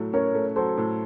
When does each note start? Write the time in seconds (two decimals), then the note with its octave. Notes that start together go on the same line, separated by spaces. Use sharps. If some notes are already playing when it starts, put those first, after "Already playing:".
Already playing: A2 F#3 A3
0.13 C#4 A#4 C#5
0.35 A3
0.56 F#3 A4 C5
0.77 A2